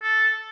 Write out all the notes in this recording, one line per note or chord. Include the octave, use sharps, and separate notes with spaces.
A4